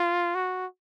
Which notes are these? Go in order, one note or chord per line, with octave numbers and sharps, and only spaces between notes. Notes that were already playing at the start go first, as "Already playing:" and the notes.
Already playing: F4
F#4